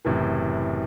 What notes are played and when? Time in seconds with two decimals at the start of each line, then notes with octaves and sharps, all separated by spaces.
0.05 F#1 A2 C3 E3